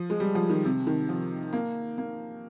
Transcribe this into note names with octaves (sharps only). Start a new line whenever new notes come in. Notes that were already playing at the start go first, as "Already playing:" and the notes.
Already playing: F3
G#3
G3
F3
D#3
C3
D#3
F3
A#3
A#3